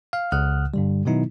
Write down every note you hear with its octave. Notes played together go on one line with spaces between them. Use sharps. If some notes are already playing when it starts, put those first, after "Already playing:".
F5 F6
C#2 C#3 F#5 D#6 F6 F#6
G2 D3 G3
B2 D#3 F#3 B3 D#4 E4